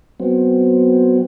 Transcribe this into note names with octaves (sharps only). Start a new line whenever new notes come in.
F#3 B3 C4